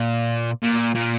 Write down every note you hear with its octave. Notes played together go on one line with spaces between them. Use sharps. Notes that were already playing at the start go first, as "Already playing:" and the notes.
Already playing: A#2
A#2
A#2